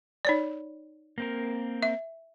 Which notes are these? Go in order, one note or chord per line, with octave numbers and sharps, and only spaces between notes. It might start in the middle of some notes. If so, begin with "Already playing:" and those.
D#4 C#5 D5
A#3 C4 A#4
E5